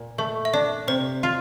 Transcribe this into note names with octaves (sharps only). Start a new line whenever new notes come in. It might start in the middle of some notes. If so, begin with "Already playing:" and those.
Already playing: A#2
A3 A#4
E5
D4 D5
C3 C5
F4